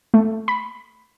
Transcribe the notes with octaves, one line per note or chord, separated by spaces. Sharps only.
A3
B5